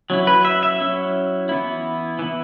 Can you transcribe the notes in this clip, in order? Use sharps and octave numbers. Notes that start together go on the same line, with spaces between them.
F#3 C#4 E4
B4
E5
E5
F#3 C#4 E4
E3 B3 E4
E3 B3 E4